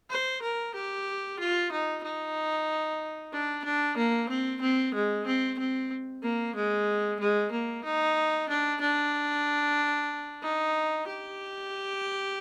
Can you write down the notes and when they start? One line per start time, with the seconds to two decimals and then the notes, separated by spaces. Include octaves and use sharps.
0.10 C5
0.42 A#4
0.74 G4
1.39 F4
1.71 D#4
2.03 D#4
3.32 D4
3.65 D4
3.97 A#3
4.29 C4
4.61 C4
4.94 G#3
5.26 C4
5.58 C4
6.23 A#3
6.55 G#3
7.20 G#3
7.52 A#3
7.84 D#4
8.49 D4
8.81 D4
10.42 D#4
11.07 G4